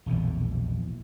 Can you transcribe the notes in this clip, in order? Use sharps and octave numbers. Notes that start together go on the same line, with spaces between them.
A#1 E2 B2 E3